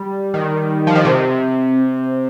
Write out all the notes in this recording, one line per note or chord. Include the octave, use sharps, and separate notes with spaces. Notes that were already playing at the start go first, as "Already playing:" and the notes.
Already playing: G3
D#3
F3
D#3
C3